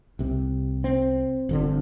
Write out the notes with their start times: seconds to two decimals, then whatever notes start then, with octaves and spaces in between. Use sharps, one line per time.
0.19 C2 C3
0.84 C4
1.49 G1 F2 D3